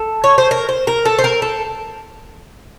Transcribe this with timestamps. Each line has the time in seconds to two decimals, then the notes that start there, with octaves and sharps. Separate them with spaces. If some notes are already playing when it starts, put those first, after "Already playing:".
Already playing: A4
0.24 C#5
0.38 C5
0.51 A#4
0.69 C5
0.87 A#4
1.05 A4
1.18 C5
1.24 A#4
1.42 A4